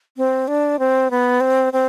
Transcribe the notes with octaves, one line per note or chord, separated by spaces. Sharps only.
C4
D4
C4
B3
C4
C4